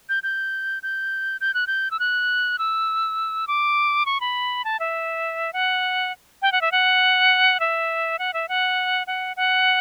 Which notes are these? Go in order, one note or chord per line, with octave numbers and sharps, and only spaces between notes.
G6
G6
G6
G6
F#6
G6
E6
F#6
E6
D6
C#6
B5
A5
E5
F#5
G5
F#5
E5
F#5
E5
F#5
E5
F#5
F#5
F#5